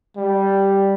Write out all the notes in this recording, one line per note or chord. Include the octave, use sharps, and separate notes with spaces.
G3